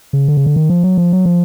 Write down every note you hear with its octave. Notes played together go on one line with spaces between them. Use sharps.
C#3
D3
C#3
D3
D#3
F3
F#3
F3
F#3
F3